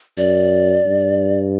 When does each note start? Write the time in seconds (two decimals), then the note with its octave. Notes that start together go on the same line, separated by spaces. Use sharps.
0.17 F#2 D5
0.86 G2